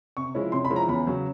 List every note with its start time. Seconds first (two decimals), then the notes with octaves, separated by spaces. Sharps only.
0.17 C3 C#6
0.35 F3 G#3 C#4 E4
0.52 C3 C6
0.65 B5
0.70 F3 G#3 C#4 E4
0.76 A#5
0.88 E2 B5
1.07 C#3 F#3